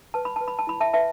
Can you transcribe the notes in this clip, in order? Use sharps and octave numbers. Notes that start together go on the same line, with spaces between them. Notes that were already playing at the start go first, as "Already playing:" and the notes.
B4 A5
B5
B4 A5
B5
A5
E4 B5
E5 A5
B4 E5 A5